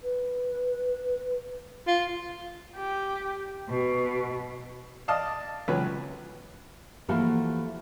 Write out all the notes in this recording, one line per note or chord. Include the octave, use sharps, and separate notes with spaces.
B4
F4
G4
B2
D5 D#5 F5 A5 D#6
C#2 F#3 C#4 B4
E3 F3 A3 A#3 F#4 A#4